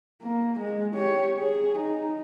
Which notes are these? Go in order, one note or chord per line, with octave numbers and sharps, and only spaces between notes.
A#3
G#3
G4 C#5
G#4
D#4